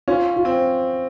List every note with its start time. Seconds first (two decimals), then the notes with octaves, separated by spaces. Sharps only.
0.08 C#4 F4
0.36 F4
0.45 C4